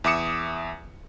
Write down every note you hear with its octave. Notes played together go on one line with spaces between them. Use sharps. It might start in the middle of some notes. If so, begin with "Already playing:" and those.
E2 E5 D6 D#6 C#7 E7